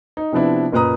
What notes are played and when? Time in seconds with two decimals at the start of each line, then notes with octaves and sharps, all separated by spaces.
0.17 D#4
0.32 C3 F3 B3 D4 E4
0.72 F#1 A#2 B4 A#5 D#6